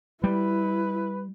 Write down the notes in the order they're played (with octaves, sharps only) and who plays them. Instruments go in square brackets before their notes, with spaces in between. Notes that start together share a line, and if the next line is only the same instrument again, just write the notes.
[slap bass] G3 [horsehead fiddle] E4 [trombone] B4